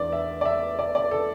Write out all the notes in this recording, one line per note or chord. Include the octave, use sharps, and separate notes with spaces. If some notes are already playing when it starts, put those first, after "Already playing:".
Already playing: E2 E3 D4 D5
E5
D5
E5
D5
D5
A4